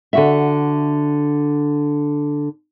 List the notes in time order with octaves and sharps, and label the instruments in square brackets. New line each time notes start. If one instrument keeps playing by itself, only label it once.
[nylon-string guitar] D3 F#4 E5